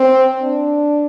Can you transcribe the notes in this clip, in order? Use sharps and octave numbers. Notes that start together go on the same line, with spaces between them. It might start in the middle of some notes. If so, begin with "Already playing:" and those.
Already playing: C4
D4